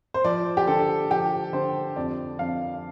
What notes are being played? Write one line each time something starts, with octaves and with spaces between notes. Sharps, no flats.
C5
F3 D5
G4
D3 A4
F3 G4
D3 C5
F2 D5
F2 F5